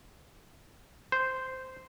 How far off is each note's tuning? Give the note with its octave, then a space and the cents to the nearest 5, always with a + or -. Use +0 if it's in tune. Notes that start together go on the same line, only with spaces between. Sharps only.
C5 -10